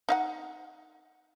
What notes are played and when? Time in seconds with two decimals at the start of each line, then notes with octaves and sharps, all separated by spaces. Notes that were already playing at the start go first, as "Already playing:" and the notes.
0.09 D#4 F5 F#5